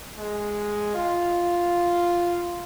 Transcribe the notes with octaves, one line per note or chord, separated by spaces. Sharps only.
G#3
F4